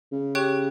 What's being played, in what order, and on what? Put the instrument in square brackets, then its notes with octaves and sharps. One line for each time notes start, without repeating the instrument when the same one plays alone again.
[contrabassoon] C#3
[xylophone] G4 C#5 G5 C#6 F#6